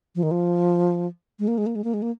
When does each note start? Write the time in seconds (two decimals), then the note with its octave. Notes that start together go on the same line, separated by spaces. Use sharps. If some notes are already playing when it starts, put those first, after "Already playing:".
0.15 F3
0.23 D#3
0.31 F3
1.39 G#3
1.48 A#3
1.58 G#3
1.66 A#3
1.75 G#3
1.84 A#3
1.94 G#3
2.02 A#3